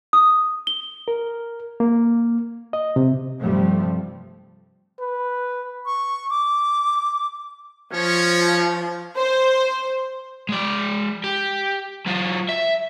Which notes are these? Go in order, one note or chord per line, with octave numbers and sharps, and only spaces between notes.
D#6
G7
A#4
A#3
D#5
C3
G2 C3 F3 G3 A3
B4
C#6
D6
F3 C#4 C#5
C5
G#3 D5
G4
F#3 F4
E5